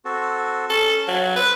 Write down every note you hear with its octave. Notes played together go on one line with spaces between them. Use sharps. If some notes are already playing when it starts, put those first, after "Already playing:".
C4 F#4 A4
C#4 A4 A5
F#3
C4 B4